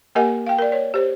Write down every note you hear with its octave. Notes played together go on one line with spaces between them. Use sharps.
A#3 G4 A#4 D#5 F#5 G#5
F5 G5
A#4 D5
C#5
G4 C5